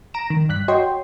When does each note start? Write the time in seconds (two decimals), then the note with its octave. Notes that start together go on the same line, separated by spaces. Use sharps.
0.14 A#5 A#6 D7 E7
0.30 D#3
0.49 G2 F#6 B6
0.68 F#4 C#5 D#5 G5 C6